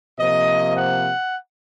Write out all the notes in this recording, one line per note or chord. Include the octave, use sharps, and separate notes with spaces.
C3 F3 A#3 D#5
F#5